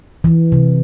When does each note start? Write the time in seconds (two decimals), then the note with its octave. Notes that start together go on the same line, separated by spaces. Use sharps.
0.24 E3
0.52 C3